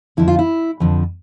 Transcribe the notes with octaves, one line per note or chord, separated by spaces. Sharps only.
F2 D3 F3 E4
F4
E4
F2 D3 F3